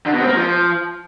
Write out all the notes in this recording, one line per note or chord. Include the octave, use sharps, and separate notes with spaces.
D3
B2
C4
A#3
F3